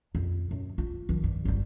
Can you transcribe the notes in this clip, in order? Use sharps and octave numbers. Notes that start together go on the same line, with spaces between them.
F2
F#2
F4
D#3 F3
G2
G1 G3